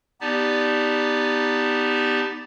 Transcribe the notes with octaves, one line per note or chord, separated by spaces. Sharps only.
B3 D#4 G4 D5 A5